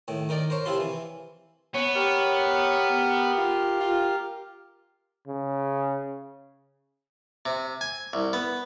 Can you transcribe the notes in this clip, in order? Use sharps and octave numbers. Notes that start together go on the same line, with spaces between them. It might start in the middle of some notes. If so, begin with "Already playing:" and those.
A2 D#3
D#3 D#4 A#4 D5
A#4 C5 C#5
C3 F3 E4 F4 C6
E3
B3 C#5
G4 A#4 C#5
F4
F4
C#3
C3
G#5
C2
B3